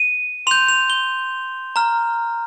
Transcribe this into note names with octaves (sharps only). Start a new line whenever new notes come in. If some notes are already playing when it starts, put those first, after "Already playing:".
Already playing: D#7
C6 G6 F7
F7
G7
A#5 F6